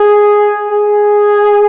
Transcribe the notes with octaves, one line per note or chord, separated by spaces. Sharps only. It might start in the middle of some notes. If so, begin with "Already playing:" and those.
Already playing: G#4
G#4